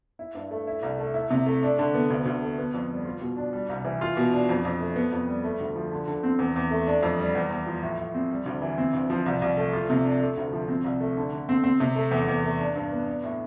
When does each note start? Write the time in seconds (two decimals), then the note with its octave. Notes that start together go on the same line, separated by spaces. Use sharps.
0.19 E4
0.35 G2
0.51 A3
0.67 E4
0.83 C2
0.99 A3
1.14 E4
1.31 C3
1.46 A3
1.63 D4
1.79 D3
1.94 B3
2.10 D2
2.25 D2
2.42 A3
2.58 B3
2.74 F2
2.90 G3
3.05 F4
3.21 B2
3.37 D4
3.53 G3
3.69 C2
3.85 E3
4.01 F4
4.17 B2
4.32 D4
4.49 F2
4.65 F2
4.80 A3
4.96 B3
5.12 F2
5.28 G3
5.44 A3
5.60 D2
5.76 F3
5.92 D3
6.08 D3
6.23 C4
6.39 E2
6.56 E2
6.71 A3
6.87 D4
7.03 F2
7.19 G3
7.35 E2
7.50 E2
7.66 F3
7.83 A2
7.99 A2
8.14 C4
8.31 G3
8.46 D2
8.62 E3
8.78 C4
8.93 D2
9.10 F3
9.26 C2
9.42 C2
9.57 A3
9.73 F4
9.90 C3
10.05 D4
10.21 A3
10.37 D2
10.53 F3
10.68 C4
10.84 C2
11.00 A3
11.17 D3
11.32 D3
11.49 C4
11.64 C4
11.80 C3
11.95 A3
12.11 E2
12.28 E2
12.44 A3
12.60 D4
12.75 G2
12.92 B3
13.07 D4
13.24 A2